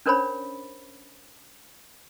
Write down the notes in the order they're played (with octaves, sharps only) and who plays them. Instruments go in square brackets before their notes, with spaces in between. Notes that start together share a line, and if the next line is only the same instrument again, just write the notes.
[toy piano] C#4 D4 A#4 C5 C#5 B5